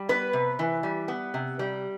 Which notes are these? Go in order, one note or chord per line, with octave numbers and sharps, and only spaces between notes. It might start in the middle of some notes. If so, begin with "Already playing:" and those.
Already playing: G3
B3 B4
C3
E3
G3
B3
C3
G3